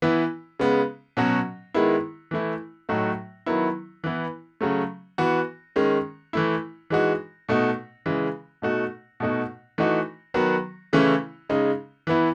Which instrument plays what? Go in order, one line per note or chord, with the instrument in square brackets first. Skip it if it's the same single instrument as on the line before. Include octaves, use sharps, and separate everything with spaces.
[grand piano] E3 B3 E4
C#3 G#3 B3
B2 F#3 C#4 F#4
D#3 G#3 B3 E4
E3 A3 E4
A2 F#3 A3 D#4 F#4
D#3 F#3 B3 E4
E3 B3 E4
C#3 F#3 A3
E3 B3 F#4
D#3 G#3 C#4
E3 A3 E4
E3 G#3 D#4 F#4
B2 A3 D#4 F#4
C#3 E3 G#3
B2 A3 D#4 F#4
B2 A3 D#4 F#4
E3 A3 D#4 F#4
D#3 F#3 B3 F#4
C#3 E3 A3 C#4 E4
C#3 G#3 D#4
E3 B3 E4